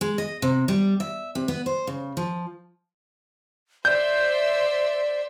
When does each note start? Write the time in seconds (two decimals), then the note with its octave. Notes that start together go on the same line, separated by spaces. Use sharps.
0.01 G#3
0.18 D#5
0.42 C3
0.68 G3
1.00 E5
1.35 C3
1.48 B3
1.66 C5
1.87 C#3
2.17 F3
3.85 C5 D5 E5 G6